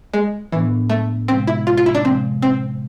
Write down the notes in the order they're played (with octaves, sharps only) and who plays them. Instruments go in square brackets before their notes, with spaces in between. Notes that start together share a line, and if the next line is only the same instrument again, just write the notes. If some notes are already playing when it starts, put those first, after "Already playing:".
[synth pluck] G#3
[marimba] A2 F3 B3 D4 [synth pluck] E3
[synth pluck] A3
[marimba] C3 F3 G#3 [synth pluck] C4
[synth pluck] E4
F4
F4
E4
D4
[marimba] C3 F3 G#3 [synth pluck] C4
[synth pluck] C4